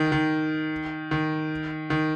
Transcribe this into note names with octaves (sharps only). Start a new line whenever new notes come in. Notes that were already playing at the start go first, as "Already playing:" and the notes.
Already playing: D#3
D#3
D#3
D#3